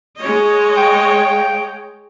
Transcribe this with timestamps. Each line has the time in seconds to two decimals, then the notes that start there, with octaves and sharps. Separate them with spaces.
0.20 G#3 C#5 D#5
0.77 G5